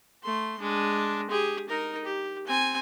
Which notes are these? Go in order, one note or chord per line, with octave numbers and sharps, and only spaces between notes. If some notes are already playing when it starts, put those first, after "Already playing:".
A3 C6
G#3 D4
G4 G#4
D#4 A#4
G4
C4 G#5